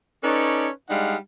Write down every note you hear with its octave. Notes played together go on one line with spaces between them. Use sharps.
C#4 D#4 A4 B4 C#5 D5
G3 G#3 D4 D#4 F5 F#5